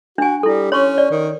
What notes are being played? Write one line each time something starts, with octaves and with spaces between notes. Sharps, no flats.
D4 F#4 G#5
G3 E4 A4
C#4 C#5 C6 C#6
D5
D#3